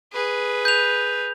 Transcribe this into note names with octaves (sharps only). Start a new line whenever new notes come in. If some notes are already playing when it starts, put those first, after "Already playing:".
G#4 B4
G6 F7